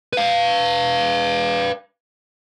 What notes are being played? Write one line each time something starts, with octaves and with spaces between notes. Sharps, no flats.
B4 F5